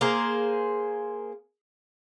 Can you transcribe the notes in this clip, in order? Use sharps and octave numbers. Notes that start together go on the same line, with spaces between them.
A#3 G#4 C5